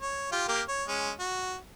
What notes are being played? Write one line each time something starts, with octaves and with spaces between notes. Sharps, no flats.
C#5
F4 G4
A#3 G4 F5
C#5
G#3 C#4
F#4